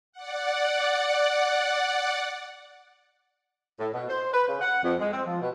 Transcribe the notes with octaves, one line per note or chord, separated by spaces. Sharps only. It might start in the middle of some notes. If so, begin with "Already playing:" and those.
D5 F#5
A2
B2
C5
B4
C#3
F#5
F2
G#3
C4
F3
B2